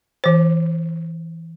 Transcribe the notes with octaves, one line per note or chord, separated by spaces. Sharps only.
E3 C5